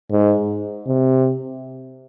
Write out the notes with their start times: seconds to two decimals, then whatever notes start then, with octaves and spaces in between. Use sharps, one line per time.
0.11 G#2
0.87 C3